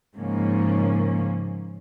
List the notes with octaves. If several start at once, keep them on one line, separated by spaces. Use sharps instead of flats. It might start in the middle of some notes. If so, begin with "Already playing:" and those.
G#2 C#3 F3 A#3 C#4